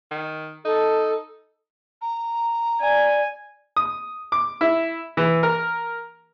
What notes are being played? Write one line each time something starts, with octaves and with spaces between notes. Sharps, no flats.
D#3
D#4 A4
A#5
D5 G#5
D#6
D6
E4
E3
A#4